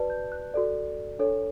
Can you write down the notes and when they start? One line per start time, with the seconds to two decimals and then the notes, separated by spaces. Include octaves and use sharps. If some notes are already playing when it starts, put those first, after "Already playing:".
Already playing: F#4 B4 D5 A5
0.10 G6
0.32 F#6
0.54 F#4 A4 D5
1.19 D4 A4 C#5